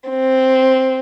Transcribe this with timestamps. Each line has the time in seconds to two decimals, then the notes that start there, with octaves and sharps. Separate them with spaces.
0.10 C4